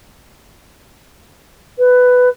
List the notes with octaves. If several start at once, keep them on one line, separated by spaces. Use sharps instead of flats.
B4